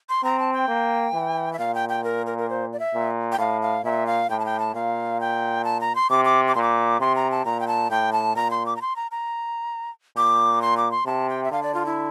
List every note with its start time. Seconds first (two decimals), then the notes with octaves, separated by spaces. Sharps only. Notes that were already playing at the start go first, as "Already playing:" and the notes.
0.09 C6
0.24 C4 A#5
0.39 A5
0.53 G5
0.68 A#3
1.14 E3
1.53 E5
1.59 A#2 F5
1.74 G5
1.89 G5
2.04 A#4
2.26 A#4
2.38 A#4
2.50 C5
2.73 D5
2.79 E5
2.94 A#2
3.32 G5
3.39 A2 F5
3.62 F5
3.84 A#2 E5
4.07 F5
4.30 A2 G5
4.40 A5
4.45 G5
4.60 A5
4.74 A#2 F5
5.20 G5
5.64 A5
5.81 A#5
5.95 C6
6.10 C3 D6
6.25 D6
6.48 D6
6.55 A#2 C6
6.62 D6
7.00 C3 C6
7.15 A#5
7.31 A5
7.45 A#2 A#5
7.60 G5
7.67 A5
7.90 A2 G5
8.13 A5
8.36 A#2 A#5
8.51 C6
8.66 D6
8.76 A#5
8.81 C6
8.96 A#5
9.11 A#5
10.16 A#2 D6
10.62 C6
10.77 D6
10.91 C6
11.06 C3 A5
11.29 G5
11.44 E5
11.51 D3 F5
11.63 D5
11.74 F4
11.86 E4